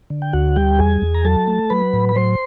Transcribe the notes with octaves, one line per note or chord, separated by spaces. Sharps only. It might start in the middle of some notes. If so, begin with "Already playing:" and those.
D3
G5
D2 F#4 F#5
G3 G4 G5
E2 G#4 G#5
E2
A#5
F#3 A4 A5
A3
F#3 B4 B5
A2
B5
F#3 C5 C6